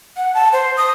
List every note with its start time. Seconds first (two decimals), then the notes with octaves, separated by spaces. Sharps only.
0.17 F#5
0.34 A5
0.53 C5
0.77 D#6